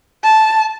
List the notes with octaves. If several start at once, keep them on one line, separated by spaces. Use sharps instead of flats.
A5